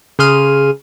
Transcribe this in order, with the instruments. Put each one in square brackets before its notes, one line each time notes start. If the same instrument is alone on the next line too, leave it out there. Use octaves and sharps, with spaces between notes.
[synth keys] C#3 G#4 C6 F6 D#7